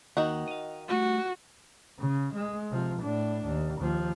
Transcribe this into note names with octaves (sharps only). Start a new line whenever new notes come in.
D#2 D#3 D#4 F#4
D#5 F5
G3 A3 F#4
C#3
G#3
C3 F3
A2 D4
D#2
D#2 F3